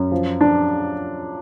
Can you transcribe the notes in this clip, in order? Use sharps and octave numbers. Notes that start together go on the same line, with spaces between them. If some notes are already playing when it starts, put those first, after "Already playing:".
Already playing: F#2
F3
D4